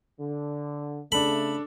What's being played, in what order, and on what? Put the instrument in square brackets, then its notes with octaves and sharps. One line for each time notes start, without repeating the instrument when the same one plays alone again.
[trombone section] D3
[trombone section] C#3 A3 [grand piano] D4 A4 [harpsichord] B5